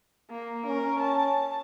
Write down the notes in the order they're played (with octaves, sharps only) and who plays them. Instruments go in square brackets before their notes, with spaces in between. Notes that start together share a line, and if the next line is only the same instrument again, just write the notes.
[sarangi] A#3
[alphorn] C#4 [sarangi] A#4
[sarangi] A5